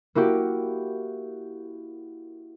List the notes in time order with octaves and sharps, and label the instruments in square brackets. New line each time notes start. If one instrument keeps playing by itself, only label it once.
[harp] A#3 E4 F#4 G4